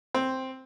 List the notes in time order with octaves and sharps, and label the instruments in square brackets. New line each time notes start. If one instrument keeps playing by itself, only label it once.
[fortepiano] C4